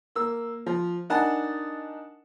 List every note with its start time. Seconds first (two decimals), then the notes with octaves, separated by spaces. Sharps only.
0.15 A#3 E6
0.66 F3
1.10 D4 D#4 A#4 F#5 G#5 A5